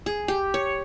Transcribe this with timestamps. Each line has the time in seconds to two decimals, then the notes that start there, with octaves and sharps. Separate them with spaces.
0.06 G#4
0.28 G4
0.54 C#5